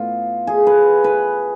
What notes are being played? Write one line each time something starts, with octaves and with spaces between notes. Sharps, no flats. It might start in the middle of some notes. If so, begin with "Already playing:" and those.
Already playing: A2 B3 F4
G#4
B4
B4